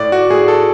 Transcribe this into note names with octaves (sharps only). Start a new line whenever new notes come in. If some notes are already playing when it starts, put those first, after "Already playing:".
Already playing: A2 D5
F#4
A2 G#4
A4